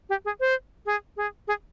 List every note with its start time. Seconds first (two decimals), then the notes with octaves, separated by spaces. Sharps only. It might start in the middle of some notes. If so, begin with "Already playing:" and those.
0.09 G4
0.25 G#4
0.40 C5
0.86 G#4
1.17 G#4
1.48 G#4